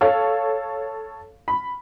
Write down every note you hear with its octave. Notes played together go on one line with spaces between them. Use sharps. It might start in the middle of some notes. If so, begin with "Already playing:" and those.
A4 C#5 F5
B5